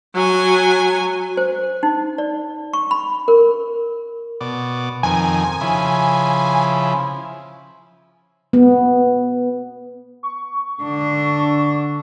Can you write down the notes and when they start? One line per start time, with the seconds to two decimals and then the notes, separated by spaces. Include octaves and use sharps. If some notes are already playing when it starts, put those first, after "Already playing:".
0.14 F#3 G#5
1.37 C5
1.83 D#4
2.18 D5
2.73 C#6
2.91 B5
3.28 A#4
4.41 B2 D5
5.03 F2 D#3 G#5
5.61 C#3 F3 E4
8.53 B3
10.23 C#6
10.83 D3 D4